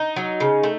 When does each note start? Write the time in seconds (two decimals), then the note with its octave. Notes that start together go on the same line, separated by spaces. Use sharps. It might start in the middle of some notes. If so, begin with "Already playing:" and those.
Already playing: D#4
0.16 F#3
0.40 C#3
0.63 A3